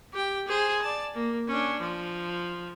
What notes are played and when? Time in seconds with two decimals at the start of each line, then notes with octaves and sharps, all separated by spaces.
0.13 G4 G5
0.47 G#4 C5
0.82 D5 A5
1.14 A#3
1.48 C#4 D4
1.81 F3